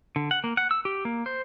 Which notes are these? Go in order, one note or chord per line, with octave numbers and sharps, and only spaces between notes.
D3
F#5
A#3
F#5
E6
G4
A#3
C5